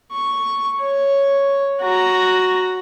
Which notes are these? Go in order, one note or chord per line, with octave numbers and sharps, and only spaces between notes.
C#6
C#5
F#4 A#5